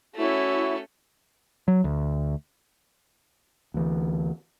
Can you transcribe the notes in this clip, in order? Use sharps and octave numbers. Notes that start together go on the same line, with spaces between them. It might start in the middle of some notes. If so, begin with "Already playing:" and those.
A3 C#4 E4 F#4
F#3
D2
D2 E3